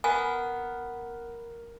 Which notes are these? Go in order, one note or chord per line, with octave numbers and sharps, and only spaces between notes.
B3 A#4 G#5